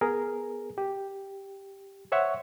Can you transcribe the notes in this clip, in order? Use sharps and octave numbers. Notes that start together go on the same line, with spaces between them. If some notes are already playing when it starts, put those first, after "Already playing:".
B3 G#4 A#4
G4
C5 C#5 E5 F#5 C#6